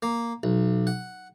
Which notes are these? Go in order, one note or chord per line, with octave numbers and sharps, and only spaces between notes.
A#3
B1
F#5